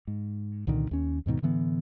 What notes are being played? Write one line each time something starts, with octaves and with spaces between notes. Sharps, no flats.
G#2
C2 A#2 D3 D#3
D#2 C#4
D#2 G#2 B2 D#3
A2 D3 E3 B3